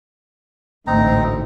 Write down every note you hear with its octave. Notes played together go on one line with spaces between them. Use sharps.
A1 D2 G#2 C4 D#4 A#5